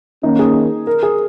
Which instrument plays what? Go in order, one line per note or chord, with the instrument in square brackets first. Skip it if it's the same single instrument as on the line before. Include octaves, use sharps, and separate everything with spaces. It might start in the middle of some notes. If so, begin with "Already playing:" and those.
[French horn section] D#3 A#3 C#4 [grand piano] D#4
[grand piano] G#4
A#4
G#4